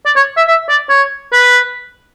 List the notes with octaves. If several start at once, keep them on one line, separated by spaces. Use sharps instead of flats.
D5
C#5
E5
E5
D5
C#5
B4